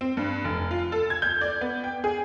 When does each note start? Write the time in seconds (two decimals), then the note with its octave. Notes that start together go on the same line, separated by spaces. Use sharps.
0.01 C4
0.17 G2
0.44 F1
0.71 F4
0.92 A4
1.10 G#6
1.22 G6
1.41 D5
1.61 B3
1.84 G5
2.04 G#4